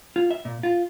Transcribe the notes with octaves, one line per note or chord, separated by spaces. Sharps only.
F4
E5
A#2
F4